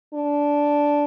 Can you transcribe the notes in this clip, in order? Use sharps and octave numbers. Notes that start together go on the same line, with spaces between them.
D4